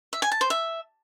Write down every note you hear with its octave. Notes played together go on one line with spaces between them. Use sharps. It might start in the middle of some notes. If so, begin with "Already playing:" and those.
E5
G#5
A5
C5
E5